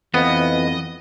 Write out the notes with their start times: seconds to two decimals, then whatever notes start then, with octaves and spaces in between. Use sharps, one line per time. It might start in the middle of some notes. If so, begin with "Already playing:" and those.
0.14 F2 E3 B3 D#5